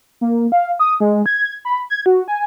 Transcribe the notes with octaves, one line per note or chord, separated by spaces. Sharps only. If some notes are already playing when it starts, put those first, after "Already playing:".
A#3
F5
D#6
G#3
G#6
B5
G#6
F#4
G#5